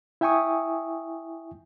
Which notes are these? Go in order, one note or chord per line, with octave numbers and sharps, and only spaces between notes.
E4 E5 G5 G#5 C#6 D#6